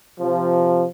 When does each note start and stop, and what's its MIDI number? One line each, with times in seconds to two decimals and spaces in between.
0.19 0.83 48
0.19 0.83 53